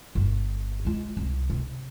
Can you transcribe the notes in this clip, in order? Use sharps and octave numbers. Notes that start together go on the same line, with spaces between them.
G1
G#3 F4
C2
C3